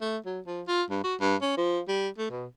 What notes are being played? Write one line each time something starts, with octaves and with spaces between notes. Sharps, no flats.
A3
F#3
F3
F4
G2
F#4
G2
C#4
F3
G3
A3
B2